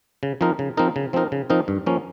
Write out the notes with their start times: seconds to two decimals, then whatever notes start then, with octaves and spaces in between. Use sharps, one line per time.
0.23 C#3
0.41 F3 C4 D#4 A#4
0.59 C#3
0.77 F3 C4 D#4 A#4
0.96 C#3
1.13 F3 C4 D#4 A#4
1.32 C#3
1.50 F3 C4 D#4 A#4
1.68 G2
1.86 F3 A#3 C#4